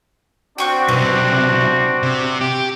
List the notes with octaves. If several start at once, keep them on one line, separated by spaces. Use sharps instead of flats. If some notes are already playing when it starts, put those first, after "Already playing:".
C4 D4 F#4 G5 C#6 F#6
B1 C3 B4
C3
G4